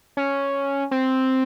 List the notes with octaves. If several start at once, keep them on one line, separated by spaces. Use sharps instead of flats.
C#4
C4